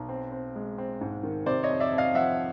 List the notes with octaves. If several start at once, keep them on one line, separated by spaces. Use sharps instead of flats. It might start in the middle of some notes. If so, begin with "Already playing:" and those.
Already playing: B1
C4
C4
G#3
C4
G#2
D#3
C3 C5 D5
C#5 D#5
F2
D5 E5
F2
D#5 F5
F3 E5 F#5